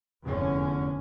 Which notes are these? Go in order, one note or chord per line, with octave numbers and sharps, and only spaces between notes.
F1 E2 D3 C#4